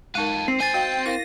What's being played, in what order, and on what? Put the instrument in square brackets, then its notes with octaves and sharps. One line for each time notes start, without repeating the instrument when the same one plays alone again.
[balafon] G#3 D#4 A#4 [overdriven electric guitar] F4 A4 [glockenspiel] D#7
[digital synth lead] C4 [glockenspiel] C7
[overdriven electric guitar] C4 C5 [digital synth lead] G#5 [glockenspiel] A6 D#7
[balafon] F#4 D#5 F5 [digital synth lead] G5
[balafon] E4 A#4 F5 [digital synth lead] A#6